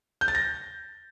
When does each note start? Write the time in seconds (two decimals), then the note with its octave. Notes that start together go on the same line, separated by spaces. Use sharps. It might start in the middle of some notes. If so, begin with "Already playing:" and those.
0.21 G6
0.28 A6
0.35 A#6